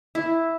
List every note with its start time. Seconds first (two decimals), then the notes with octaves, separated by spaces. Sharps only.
0.15 E4